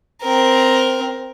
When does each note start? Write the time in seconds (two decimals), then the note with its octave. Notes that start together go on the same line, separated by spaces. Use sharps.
0.23 C4 A#4